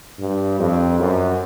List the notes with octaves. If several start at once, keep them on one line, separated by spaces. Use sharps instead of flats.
G2
F2
F#2